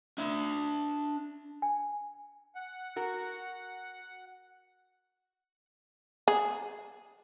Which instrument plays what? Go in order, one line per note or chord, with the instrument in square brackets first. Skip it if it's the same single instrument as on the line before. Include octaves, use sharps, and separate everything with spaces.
[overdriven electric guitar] D4 E5
[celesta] G#5
[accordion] F#5
[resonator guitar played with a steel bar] F#4 A#4
[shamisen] G#4